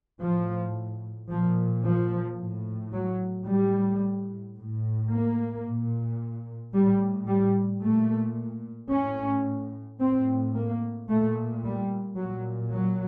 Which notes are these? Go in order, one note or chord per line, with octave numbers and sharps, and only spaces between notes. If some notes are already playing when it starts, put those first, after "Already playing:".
A2 F3
A#2 F3
F3
A2
F#3
A2 G3
A2
A#3
A#2
A2 G3
G3
A#2 A3
A2 C#4
A2 C4
A#3
A#2 A3
G3
A#2 F#3
F#3